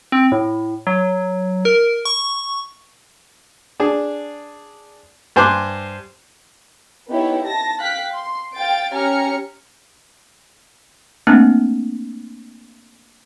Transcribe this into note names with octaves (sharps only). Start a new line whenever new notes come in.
C4
A2
F#3
A#4
C#6
D4 G#4
G2 C5 G#5 C6 D6 F#6
B3 D#4 E4 G4 C#5
A5 A#6
F5 G5 F#6 B6
C6
F5 G5 A6 D7
C#4 G4 G#5 A#5 F6 C#7
A3 A#3 C4 D4